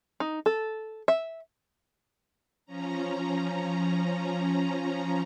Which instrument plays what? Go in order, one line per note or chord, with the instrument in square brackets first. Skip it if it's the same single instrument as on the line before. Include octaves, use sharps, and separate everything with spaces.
[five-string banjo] D#4
A4
E5
[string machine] F3 C#4 A#5